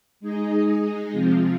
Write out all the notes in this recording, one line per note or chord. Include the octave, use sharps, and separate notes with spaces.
G#3 D#4 G#4 D#5
C3 F3 G#3 C4 F4